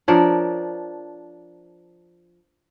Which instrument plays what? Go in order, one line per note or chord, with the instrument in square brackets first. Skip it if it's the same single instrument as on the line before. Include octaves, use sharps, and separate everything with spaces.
[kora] F3 D4 A#4 C#5